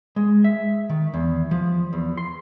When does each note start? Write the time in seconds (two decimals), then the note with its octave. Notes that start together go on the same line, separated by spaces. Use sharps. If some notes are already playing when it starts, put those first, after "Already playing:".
0.16 G#3
0.44 E5
0.90 D#3
1.14 E2
1.51 F3
1.93 E2
2.17 C6